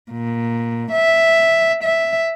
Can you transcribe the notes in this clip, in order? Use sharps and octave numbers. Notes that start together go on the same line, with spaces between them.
A#2
E5
E5